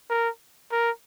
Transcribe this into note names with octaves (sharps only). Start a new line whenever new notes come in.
A#4
A#4